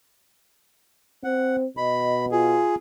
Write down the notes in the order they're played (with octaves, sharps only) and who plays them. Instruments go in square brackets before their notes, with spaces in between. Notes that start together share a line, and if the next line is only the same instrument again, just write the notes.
[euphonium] C4 [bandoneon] F#5
[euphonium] B2 [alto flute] D#5 [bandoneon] B5
[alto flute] F4 [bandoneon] G#4